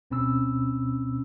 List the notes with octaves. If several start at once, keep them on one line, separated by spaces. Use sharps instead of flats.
D2 B2 C4 C#4 B5 E6